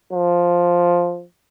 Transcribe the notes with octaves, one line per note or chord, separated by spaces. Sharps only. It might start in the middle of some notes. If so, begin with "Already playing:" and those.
F3